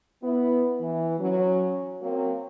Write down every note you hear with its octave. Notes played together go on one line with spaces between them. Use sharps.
B3 E4
E3
F#3 C#4
F#3 A#3 C4